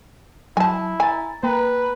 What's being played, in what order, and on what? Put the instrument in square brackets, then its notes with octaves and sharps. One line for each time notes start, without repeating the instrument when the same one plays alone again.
[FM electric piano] F#3 [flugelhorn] E4 [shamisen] G#5 A5
[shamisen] G#5 [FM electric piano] A#5 A6
[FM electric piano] A#3 G5 A#5 [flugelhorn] B4